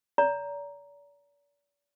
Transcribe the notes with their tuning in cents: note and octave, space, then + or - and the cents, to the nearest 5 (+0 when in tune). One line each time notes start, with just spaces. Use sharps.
D5 -40 A#5 +0